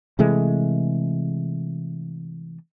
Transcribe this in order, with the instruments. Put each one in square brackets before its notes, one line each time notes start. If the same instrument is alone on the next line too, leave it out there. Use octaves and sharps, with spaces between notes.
[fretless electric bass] C3 E3 G#3 A3